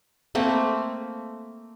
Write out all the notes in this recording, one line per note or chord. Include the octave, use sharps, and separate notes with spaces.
A3 A#3 C4